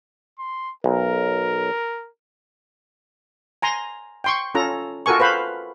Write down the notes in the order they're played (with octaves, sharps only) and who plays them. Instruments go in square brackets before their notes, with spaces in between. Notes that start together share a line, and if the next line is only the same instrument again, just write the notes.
[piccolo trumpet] C6
[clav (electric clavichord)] B1 [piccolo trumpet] A#4
[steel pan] G#5 A#5 C6
G5 C6 C#6
C#4 F4 A4 A#5
F4 F#4 A4 A#4 G#5 C#6
B4 C5 F5 B5